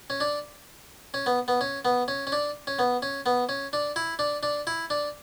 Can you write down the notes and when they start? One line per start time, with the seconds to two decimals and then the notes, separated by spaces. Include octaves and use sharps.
0.10 C#4
0.20 D4
1.14 C#4
1.26 B3
1.48 B3
1.61 C#4
1.85 B3
2.08 C#4
2.27 C#4
2.32 D4
2.67 C#4
2.79 B3
3.02 C#4
3.26 B3
3.49 C#4
3.73 D4
3.96 E4
4.19 D4
4.43 D4
4.67 E4
4.90 D4